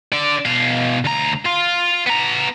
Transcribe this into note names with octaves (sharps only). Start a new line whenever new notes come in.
D3 D5
B2 F5
D2 A#5
F4 F5
B3 A#5